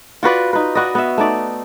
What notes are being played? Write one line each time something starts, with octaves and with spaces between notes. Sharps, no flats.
F4 F#4 B4 D5
D#4 B4
F#4 B4 D5 D#5
B3 E5
A3 D#4 D5